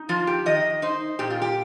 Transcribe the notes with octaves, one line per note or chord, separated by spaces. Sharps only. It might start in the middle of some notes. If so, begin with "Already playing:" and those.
Already playing: D#4
F3 F4
G4
D#3 D#5
D#4 C5
A#2 G4
F4
G4